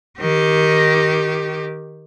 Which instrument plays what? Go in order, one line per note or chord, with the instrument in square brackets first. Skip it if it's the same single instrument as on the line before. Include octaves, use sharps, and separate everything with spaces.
[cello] D#3 G4